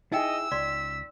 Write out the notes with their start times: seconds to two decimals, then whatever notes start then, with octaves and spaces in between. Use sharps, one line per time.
0.12 D#4 E4 G#4 D#5 G5 E6
0.52 C#2 D5 C6 B6